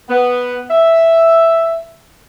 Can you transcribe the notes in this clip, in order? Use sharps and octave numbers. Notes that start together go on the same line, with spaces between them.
B3
E5